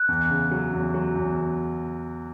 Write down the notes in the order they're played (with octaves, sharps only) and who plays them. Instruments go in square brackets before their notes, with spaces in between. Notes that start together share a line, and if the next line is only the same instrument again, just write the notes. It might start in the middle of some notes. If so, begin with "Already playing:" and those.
Already playing: [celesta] F#6
[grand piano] E2
C#3
F#3
E2
F#3
E2